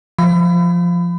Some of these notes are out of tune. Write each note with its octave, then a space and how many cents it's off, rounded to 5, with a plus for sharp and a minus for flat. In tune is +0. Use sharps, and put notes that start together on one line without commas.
F3 +0 B5 +30